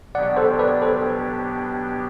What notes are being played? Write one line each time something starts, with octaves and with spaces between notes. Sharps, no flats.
B2 F#3 B3 D4 G4 D5 F#5
A4 C5
B4 D5
A4 C5